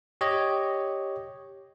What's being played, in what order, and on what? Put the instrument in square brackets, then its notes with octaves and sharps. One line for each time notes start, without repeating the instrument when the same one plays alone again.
[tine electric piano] G4 C#5 D#5